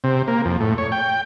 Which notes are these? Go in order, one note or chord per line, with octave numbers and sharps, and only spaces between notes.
C3
A#3
F2
A2
C#5
G5